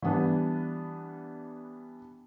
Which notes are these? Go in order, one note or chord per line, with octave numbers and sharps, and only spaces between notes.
E3 G3 B3 D4